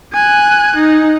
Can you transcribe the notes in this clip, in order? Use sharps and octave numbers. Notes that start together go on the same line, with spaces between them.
G#5 F#6
D#4